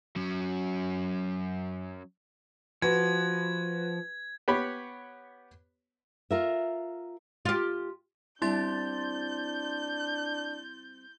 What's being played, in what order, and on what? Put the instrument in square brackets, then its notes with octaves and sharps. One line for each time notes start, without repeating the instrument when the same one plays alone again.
[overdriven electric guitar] F#3 C#4
[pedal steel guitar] F3 [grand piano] F#4 B4 [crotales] G#6
[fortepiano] B3 G4 C#5 B5
[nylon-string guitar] F4 A#4 E5
[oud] F4 G4
[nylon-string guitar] G3 C4 E5 [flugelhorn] D4 [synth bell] E4 C6 A6 [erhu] G6